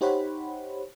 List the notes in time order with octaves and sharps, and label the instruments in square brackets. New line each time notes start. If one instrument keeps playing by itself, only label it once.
[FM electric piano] D#4 G4 C5 C#5 F#5 B5